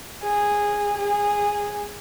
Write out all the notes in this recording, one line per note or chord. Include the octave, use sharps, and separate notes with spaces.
G#4
G#4